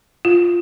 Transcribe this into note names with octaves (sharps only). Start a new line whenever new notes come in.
F4